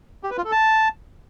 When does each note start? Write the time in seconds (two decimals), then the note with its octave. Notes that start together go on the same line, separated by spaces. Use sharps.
0.23 G4
0.30 B4
0.37 F4
0.45 A4
0.52 A5